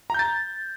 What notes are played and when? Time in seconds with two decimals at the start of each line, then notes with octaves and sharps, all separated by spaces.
0.10 A#5
0.14 G6
0.19 A6